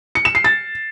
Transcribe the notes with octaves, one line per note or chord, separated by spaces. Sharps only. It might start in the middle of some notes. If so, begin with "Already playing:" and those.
C#7
E7
C7
A6